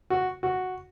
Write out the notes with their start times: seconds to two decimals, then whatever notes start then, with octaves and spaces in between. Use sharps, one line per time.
0.10 F#4
0.43 F#4